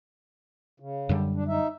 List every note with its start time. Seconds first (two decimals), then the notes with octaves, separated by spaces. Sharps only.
0.80 C#3
1.09 F#2 D3 G3
1.35 D4
1.48 D#4 E5